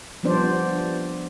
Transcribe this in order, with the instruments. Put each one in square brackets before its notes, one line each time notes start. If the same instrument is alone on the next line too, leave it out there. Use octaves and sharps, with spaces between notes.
[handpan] F3 G3 B3 D4 C5 D5